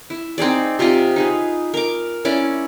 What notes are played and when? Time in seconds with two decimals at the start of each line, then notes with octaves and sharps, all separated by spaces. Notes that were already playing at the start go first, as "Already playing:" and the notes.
0.10 E4
0.38 C4 D#4 G#4 D5
0.79 C3 F4 D5 D#5
1.16 D#4 G#4 B4
1.74 A#4 D6
2.25 C#4 E4 D5